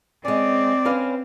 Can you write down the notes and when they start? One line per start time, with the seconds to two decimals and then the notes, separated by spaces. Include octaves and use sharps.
0.25 G#3 C4 C#4 D5
0.85 C#4 B4 F5